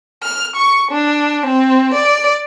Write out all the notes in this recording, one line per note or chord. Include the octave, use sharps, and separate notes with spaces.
F6
C#6
D4
C4
D5